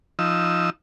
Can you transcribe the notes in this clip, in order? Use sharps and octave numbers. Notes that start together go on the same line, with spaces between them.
F3 D#4 E6